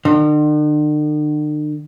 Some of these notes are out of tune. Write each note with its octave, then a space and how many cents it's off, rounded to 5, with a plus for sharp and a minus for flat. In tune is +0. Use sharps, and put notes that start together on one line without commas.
D3 +45